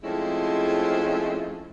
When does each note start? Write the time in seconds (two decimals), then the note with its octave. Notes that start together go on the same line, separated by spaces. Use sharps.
0.04 F3 G#3 A3 C4 C#4 E4